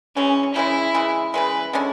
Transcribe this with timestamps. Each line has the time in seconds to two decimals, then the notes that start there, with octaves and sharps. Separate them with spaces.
0.16 C#3 E3 G#3 C#4
0.55 C#3 E3 G#3 E4
0.94 C#3 E3 G#3
1.34 C#3 E3 G#3 B4
1.73 D3 G#3 C#4 E4